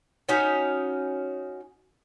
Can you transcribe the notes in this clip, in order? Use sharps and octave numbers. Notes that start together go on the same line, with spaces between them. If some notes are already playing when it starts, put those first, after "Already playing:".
C#4 D#4 F#4 C#5